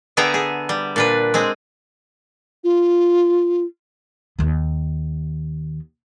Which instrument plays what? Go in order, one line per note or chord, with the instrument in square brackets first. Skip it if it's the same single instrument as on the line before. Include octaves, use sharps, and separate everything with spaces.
[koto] D3 B3 G#4 E5 G5 A#5
G#4
G3
A#2 D4 B4
G#3 C4 G#4
[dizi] F4
[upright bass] D#2 D#3